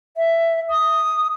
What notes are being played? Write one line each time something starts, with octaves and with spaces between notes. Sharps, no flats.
E5
D#6